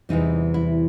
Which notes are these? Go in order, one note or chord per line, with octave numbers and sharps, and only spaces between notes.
E2 C3 E3 G3 D#4
E4